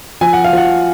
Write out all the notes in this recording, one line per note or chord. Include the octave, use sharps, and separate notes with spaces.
F3 G#5
F#5
F5
F3 F#5